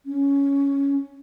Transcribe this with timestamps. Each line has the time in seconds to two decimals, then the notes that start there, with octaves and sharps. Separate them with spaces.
0.06 C#4